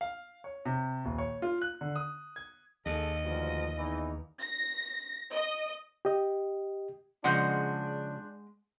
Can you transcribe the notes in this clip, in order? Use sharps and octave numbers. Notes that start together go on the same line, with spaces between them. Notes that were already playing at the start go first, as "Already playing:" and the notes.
F5
C#5
C3
D#1
C#5
F4
F#6
D3
D#6
G#6
D#2 G#4 A4 D#5
D2 G2 F3
E2 E3 D#4
A#6
D#5
G4 D#5
C#3 F3 G#3 D4 D#5 F#5 C6 G6